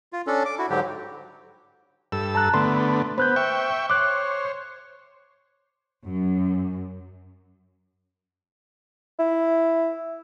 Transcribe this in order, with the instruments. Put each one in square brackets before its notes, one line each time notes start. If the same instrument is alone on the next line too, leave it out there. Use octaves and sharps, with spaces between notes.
[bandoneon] F4
C#4 D4 A4
D6
E4 F#4
G#2 D3 F#3 G4
[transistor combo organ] G2 A4 E6
[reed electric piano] A5 A#5 F#6
[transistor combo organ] D3 A3 B3 [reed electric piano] C6
[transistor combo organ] B3 [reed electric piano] C5 F#6 G6
[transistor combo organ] E5 G5 C#6
[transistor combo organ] C5 C#5 [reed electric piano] D6 F#6
[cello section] F#2
[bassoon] E4